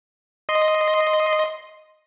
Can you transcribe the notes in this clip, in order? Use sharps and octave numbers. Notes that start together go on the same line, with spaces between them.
D#5 C6